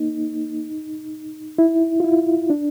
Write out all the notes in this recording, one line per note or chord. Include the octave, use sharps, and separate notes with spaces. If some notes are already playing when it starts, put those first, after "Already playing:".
Already playing: A#3 D#4
E4
F4
E4
D4